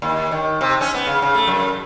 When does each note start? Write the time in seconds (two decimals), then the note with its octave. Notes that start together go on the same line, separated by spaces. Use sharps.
0.02 D#2
0.31 D#3
0.61 C3
0.81 C#4
0.94 B3
1.07 C#3
1.22 C#3
1.35 A3
1.47 F#2